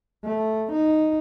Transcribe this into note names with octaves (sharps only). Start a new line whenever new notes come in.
A3
D#4